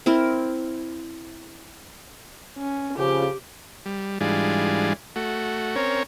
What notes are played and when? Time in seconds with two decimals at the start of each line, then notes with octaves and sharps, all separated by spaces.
0.06 C4 E4 A#4
2.57 C#4
2.98 C#3 F3 G4
3.86 G3
4.21 G#2 E3 G3 D4 F4 G#4
5.16 A3 F#4
5.76 C4 C#4 A#4 C#5